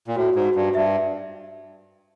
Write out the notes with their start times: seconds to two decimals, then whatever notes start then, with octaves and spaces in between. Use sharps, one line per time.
0.07 A#2
0.16 A2 F#4
0.35 G#2
0.45 F#4
0.55 G2
0.75 G2 E5